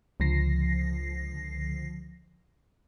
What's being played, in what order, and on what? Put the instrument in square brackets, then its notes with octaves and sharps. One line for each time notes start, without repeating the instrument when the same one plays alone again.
[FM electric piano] C#2 D3 F3 A#6 C7